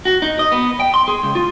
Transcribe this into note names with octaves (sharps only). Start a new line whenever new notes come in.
F#4
D#4
D#5
B3
G5
C6
G#4
C#2
F4